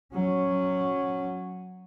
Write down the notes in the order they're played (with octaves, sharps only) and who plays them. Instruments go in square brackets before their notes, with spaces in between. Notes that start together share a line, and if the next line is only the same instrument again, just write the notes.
[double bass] F#3 C#4